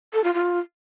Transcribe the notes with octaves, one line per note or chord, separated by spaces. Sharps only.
A4
F4
F4